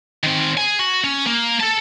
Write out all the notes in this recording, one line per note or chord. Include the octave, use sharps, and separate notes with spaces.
D#3 C4
G#4 G#5
F#4
C#4
A#3
A4 A5